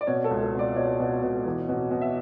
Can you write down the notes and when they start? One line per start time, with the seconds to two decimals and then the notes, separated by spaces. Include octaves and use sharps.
0.01 D5
0.07 B2 C#5
0.24 A4
0.31 C#2
0.42 A4
0.54 B2
0.59 D5
0.76 B2 C#5
1.00 B2
1.23 B2
1.46 E2
1.69 B2
1.91 B2
2.01 E5